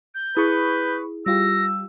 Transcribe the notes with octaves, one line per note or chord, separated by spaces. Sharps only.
G6
E4 G#4 B4 B5 C#6 D#6
G3 F4 G4 E6 A#6